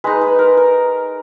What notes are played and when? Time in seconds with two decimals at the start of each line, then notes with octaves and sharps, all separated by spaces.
0.04 G#3 D#4 B4
0.21 B4
0.39 A#4
0.57 A#4